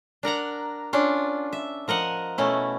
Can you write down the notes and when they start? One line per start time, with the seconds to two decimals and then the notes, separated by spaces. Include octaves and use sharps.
0.23 D4 A#4 F#5 A#5
0.93 C#4 D4 F4
1.53 E5
1.88 F3 A#4 D#5 F#5
2.38 B2 A3 C#4 E4